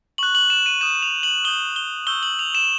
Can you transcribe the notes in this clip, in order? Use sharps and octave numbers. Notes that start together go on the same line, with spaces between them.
C#6 F#6 F#7
F#7
E7
D#7
D#6 G6 E7
F7
F#7
D#6 G6 G7
G7
C#6 E6 G6 G7
F#7
F7
E7